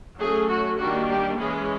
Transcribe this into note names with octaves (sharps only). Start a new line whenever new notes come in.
F#3 A3 C#4 G#4
F#4
D#3 G3 A#3 D4 F#4
G4
E3 G#3 C#4 G#4